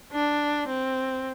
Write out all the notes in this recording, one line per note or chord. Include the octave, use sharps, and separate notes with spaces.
D4
C4